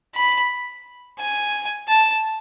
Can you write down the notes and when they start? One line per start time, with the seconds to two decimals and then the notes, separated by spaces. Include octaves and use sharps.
0.15 B5
1.19 G#5
1.88 A5